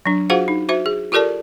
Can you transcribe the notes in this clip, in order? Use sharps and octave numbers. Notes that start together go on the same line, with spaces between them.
F#3 D4
F4 F#4 G#4 C5 F5 F#5
D#4
F#4 C5 E5
G#4
F4 G4 A4 A#4 D5 A5